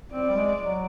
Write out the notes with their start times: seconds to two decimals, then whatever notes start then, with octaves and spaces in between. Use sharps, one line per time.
0.12 C4 D5
0.30 G3
0.36 G#3
0.59 F#3